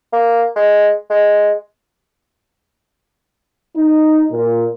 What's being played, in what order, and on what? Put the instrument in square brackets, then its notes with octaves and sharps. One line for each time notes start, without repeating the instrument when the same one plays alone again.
[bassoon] A#3
G#3
G#3
[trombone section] D#4
A#2